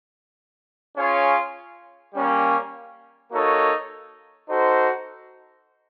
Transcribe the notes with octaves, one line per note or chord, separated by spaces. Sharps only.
C#4 F4 G#4 C#5 F5
G3 A#3 C#4
A#3 D#4 F#4 A4 C#5
D#4 F#4 A4 C5